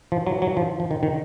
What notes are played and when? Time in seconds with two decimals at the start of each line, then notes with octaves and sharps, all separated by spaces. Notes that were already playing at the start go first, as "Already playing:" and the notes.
0.12 F3
0.27 F#3
0.42 F#3
0.57 F3
0.80 F3
0.91 D#3
1.03 D#3